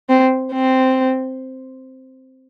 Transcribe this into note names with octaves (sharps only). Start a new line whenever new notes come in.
C4
C4